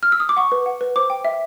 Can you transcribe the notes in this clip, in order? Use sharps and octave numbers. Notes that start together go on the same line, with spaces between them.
F6
E6
D#6
D6
F#5 C#6
B4
F#5
B4
C5 D6
G5
E5